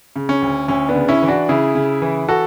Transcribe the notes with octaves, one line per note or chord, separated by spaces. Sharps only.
C#3
C#4
D2
D2 C#4
B3 D4
C#3
C#4 E4
E3
D4 F#4
C#3 E4 G#4
C#3
E3
F#4 A4